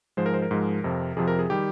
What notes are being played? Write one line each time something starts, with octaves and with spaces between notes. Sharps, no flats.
G#2 F3 G#3 C5
A#4
C5
A#4
G#2 F3 G#3
F2 C3 F3
F2 C3 F3 G#4
A#4
G#4
D#3 G3 G4